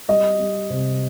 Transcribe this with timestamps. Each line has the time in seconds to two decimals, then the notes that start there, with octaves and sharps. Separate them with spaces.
0.08 G3 D#5
0.40 G3
0.70 C3